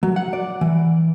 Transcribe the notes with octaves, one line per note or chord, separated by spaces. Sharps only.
F#3
F#5
D5
E3